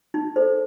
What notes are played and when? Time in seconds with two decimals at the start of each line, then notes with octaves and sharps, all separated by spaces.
0.14 D#4
0.36 A4 C5